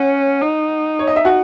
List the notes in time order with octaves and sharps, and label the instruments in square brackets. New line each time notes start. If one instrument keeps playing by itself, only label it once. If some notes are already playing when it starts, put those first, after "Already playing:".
Already playing: [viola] C#4 [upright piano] F#5
[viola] D#4
[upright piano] C#5
D#5
E5
F#4 F#5